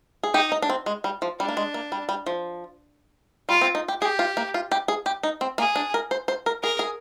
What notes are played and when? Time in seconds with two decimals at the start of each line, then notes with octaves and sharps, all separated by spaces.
0.23 G#4
0.34 D#4 G4
0.52 D#4
0.62 D4
0.70 C4
0.86 G#3
1.04 G3
1.22 F3
1.40 G3 D4
1.48 A#3
1.57 G#3
1.74 A#3
1.92 G3
2.09 G3
2.26 F3
3.49 G3 F4
3.61 C4
3.75 D#4
3.88 G4
4.01 G4 G#4
4.19 F4
4.37 A#3
4.54 F4
4.72 G4
4.88 G#4
5.06 G4
5.23 D#4
5.41 C4
5.58 A#3 G#4
5.76 D4
5.94 A#4
6.11 C5
6.28 C5
6.46 A#4
6.63 G#4 A#4
6.79 G#4